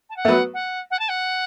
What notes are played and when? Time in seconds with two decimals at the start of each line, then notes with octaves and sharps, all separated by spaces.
0.10 A5
0.17 F#5
0.25 A3
0.28 F#3 B3
0.54 F#5
0.91 F#5
0.99 A5
1.09 F#5